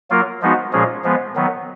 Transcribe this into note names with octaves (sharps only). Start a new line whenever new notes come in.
F#3 A#3 F4 A#4
F3 G#3 B3 D#4 F#4
A#2 F3 G#3 C#4 G#4
F3 G#3 B3
D#3 F#3 B3